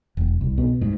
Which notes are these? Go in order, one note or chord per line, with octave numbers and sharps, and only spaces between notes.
E1
C2
B2
G#2